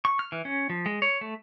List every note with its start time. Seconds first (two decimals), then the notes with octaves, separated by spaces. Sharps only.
0.05 C#6
0.19 F6
0.32 E3
0.45 C#4
0.70 F3
0.86 G#3
1.02 C#5
1.21 A3